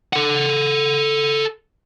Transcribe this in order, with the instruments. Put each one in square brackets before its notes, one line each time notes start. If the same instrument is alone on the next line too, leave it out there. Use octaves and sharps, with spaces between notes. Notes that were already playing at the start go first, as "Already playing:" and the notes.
[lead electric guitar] A4 F#5